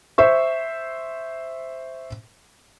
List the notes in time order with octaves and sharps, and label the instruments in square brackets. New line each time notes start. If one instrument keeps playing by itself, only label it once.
[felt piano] C5 E5 C#6